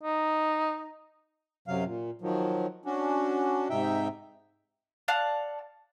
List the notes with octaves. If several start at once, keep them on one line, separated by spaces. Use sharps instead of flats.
D#4
F#2 C3 F#3 F5
A#2
D#3 F3 F#3
C#4 D4 F#4
G#2 C3 D#4 E5 G5
D5 F5 F#5 A5